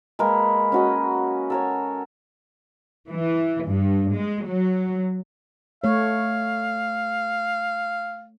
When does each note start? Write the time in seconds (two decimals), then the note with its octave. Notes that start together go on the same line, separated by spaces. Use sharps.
0.19 G#3 A#3 A#4 B4
0.72 C#4 F#4 D#5
1.50 A4 A#4 C#5
3.10 E3
3.68 G2
4.14 G#3
4.47 F#3
5.84 A3 C#5 F5